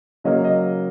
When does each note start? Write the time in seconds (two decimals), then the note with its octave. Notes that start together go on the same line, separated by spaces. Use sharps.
0.24 C#3 F#3 A#3 D#5
0.44 D#5